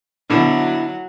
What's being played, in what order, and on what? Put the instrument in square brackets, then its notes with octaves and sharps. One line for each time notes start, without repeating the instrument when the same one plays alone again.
[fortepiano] B2 D3 [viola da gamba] F#3 [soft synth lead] E4